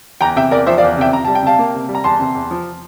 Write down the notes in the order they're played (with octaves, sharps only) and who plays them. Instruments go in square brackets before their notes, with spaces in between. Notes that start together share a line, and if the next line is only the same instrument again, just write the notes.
[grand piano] E2 G5 A#5
C3 E5 G5
E2 A#4 D5
F3 C5 E5
D5 F5
E2
C3 E5 G5
C3 A#5
G3 A5
G5
C3 F5 A5
A#3
C3
G3
A#5
E2 A5 C6
C3
E2
F3